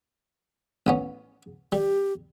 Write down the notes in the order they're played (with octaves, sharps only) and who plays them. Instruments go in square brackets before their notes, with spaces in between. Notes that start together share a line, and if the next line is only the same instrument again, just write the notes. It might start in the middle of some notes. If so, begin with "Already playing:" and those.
[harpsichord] A1 B3 C#4
[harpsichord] G3 [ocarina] G4